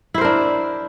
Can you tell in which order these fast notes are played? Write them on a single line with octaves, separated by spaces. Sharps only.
E4 C5 A#4 D4